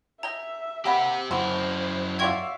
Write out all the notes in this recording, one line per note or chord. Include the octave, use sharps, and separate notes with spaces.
D#5 E5 G5 G#5 A#5
A#3 C4 G4 F#5 B5
F#2 E3 C4 E4 F#4 C5
F#3 F4 D5 E5 F5 G5 C#6 G#6